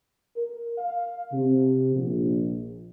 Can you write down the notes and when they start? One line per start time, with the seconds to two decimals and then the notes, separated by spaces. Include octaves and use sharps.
0.36 A#4
0.78 F5
1.31 C3
1.94 A#1